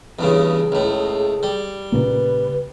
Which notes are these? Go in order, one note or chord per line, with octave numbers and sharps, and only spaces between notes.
E2 G2 C#3 G#4
C#2 A2
G3
A#2 C#3 A#3 B4